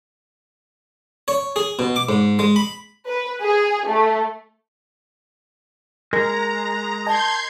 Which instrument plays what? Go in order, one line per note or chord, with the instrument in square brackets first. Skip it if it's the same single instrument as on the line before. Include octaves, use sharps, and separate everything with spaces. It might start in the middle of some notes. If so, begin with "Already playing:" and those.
[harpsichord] C#5
G#4
B2
D6
G#2
G#3
B5
[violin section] B4
G#4
A3
[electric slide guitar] G#3 [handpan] A#4 [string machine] A#5
[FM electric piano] D#5 G#5 A5 [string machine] C6 G6 G#6